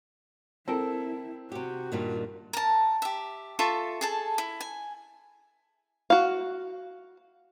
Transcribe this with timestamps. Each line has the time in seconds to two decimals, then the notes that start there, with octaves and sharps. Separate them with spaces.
0.68 C4 E4 A4 A#4
1.52 C3 F#4 G4
1.92 G2 A#2 D#3
2.53 A#4 A5
3.02 G4 E5
3.59 F4 A4 E5 C#6
4.01 G#4 A4 A5
4.38 E4
4.61 G#5
6.10 F#4 F5